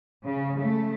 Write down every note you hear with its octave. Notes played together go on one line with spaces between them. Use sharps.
C#3
A3